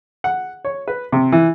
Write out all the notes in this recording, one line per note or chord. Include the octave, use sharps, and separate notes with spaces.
F#5
C#5
B4
C3
E3